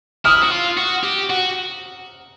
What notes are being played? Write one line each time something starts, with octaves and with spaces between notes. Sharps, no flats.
E4 D#6 F6
F#4
F4
F#4
G4
F#4